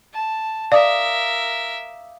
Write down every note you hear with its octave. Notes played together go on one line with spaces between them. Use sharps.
A5
A#4 D5 E5 F5 D6 D#6